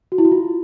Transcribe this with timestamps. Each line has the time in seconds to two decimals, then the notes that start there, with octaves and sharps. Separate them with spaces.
0.12 F#4
0.18 E4
0.25 F#4
0.31 F4